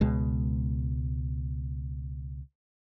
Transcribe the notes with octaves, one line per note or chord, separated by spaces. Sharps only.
C#2 B2 G#3